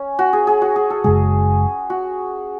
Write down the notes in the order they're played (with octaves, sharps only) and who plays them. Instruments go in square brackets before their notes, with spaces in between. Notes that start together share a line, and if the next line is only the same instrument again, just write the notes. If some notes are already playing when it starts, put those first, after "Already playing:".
Already playing: [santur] C#4
F#4
G#4
G#4
F#4
G#4
A4
[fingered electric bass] F#1 F#2 C#3 G#3 [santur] G#4
[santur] F#4